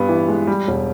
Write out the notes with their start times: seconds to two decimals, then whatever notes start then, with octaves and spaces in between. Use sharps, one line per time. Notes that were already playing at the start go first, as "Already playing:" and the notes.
Already playing: G2 B3
0.09 E3
0.28 G#3
0.47 G3
0.68 E1